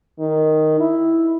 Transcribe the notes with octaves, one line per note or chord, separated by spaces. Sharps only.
D#3
E4